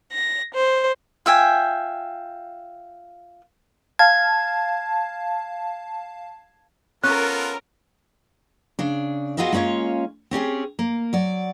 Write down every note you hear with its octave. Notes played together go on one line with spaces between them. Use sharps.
A#6
C5
F4 E5 G5 G#5
F5 A5 G#6
B3 C#4 F4 A4 A#4 F#6
C#3 D4
B3 F4 F#4 G#4 D#5 E5
G#3 A#3 C#4 F4 C#5
C4 C#4 G4 G#4
A#3
F#3 D5